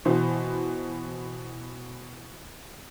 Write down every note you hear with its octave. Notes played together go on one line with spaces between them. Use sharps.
B2 E3 C5